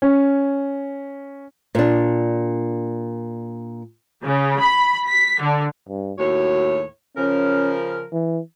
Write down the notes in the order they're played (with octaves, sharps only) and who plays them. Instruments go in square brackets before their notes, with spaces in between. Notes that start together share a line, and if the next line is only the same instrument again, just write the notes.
[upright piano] C#4
[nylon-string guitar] A#2 D4
[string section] C#3
B5
B6
D3
[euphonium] G2
[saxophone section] D#2 A2 C#5 [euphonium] F#4
[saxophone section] C#3 F3 A#4 [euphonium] C#4
[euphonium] E3